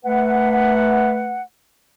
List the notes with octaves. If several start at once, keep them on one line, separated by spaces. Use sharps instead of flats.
A3 B4 F#5